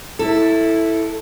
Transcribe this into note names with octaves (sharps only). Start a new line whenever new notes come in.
E4 A4